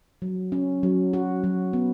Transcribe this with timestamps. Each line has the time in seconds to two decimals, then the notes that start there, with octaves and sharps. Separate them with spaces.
0.22 F#3
0.52 C#4
0.83 F#3
1.13 F#4
1.43 F#3
1.73 B3